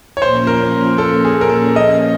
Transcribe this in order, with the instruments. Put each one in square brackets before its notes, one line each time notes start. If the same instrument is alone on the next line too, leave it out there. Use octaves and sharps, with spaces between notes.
[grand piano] C#5
[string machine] A#2 F3 A#3 C#4 [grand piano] C5
[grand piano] A#4
A4
G#4
A#4
A4
D#5